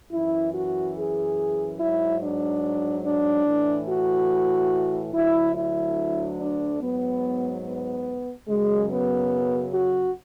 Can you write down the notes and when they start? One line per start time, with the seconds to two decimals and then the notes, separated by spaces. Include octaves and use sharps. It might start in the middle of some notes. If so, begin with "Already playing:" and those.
0.11 F#2 E3 E4
0.53 F#4
0.96 G#4
1.78 G#2 F#3 E4
2.21 D4
3.04 D4
3.46 A2 E3
3.89 F#4
5.13 D2 D3 F#3 E4
5.55 E4
6.39 D4
6.80 G#2 F#3 B3
7.65 B3
8.48 F#2 C#3 F#3 G#3
8.90 B3
9.73 F#4